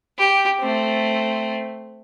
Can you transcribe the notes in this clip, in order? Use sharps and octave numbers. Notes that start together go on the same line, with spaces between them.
G4
A3 C4